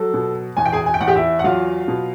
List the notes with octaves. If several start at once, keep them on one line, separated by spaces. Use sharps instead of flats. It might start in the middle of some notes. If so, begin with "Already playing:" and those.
Already playing: F#3 A4
B2
E2 G#5
G5
G#4 G#5
G#5
G5
E2 F#5
G4 G5
E4 E5
F#5
F#3 F4 F5
B2